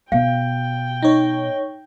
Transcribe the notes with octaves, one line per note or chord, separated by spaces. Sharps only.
B2 F5 G5
D#4 C#5